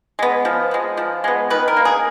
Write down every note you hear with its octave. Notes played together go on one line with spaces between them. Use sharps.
G#3 B3
F3
G#3 B3
F3
G#3 B3
D#3 B4
A#4
A#3
G#4